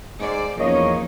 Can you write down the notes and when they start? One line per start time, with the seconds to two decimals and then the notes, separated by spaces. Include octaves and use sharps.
0.20 G#2 C5 D5
0.59 E2 F3 A#3 C#4 D#4 C#5 D#5